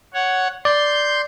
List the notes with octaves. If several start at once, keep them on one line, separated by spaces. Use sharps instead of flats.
C#5 F#5
D5 C6 G6